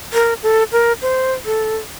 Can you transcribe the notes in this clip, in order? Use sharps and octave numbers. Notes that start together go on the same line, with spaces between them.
A#4
A4
A#4
C5
A4